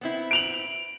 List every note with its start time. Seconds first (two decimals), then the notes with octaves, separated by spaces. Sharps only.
0.01 B3 C4 E4
0.31 D7 F7 F#7